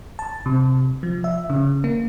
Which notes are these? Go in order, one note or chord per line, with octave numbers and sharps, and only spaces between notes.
A5
C3
F3
E5
C#3
A#3